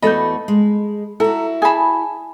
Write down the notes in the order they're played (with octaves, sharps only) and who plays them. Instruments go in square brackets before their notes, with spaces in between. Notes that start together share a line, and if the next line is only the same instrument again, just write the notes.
[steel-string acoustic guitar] E2 A3 F#4 [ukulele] A4 D#5 [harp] B5 G6
[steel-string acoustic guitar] G#3
[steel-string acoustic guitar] E4 F#4 [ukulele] A4 A#5
[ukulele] G#4 A5 [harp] G#5 B5